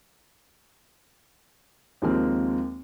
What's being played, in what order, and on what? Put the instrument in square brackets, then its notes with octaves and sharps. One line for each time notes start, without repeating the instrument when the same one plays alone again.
[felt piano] D#2 F3 G#3 A#3 C4